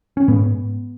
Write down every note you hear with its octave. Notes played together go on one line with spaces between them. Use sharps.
C#4
G#2 B3